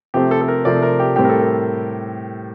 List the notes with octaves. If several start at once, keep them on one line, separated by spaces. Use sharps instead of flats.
C3 F3 A3 C4 G4
A4
A4
A#4
C3 F3 A3 C4 D5
A#4
G4
A2 G3 C4 G4
A#4
A4
A#4